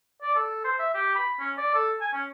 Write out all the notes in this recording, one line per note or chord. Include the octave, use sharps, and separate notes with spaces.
D5
A4
C5
E5
G4
B5
C#4
D5
A4
G#5
C#4